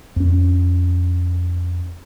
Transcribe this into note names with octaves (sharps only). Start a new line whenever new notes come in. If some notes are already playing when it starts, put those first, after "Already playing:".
F2 C#4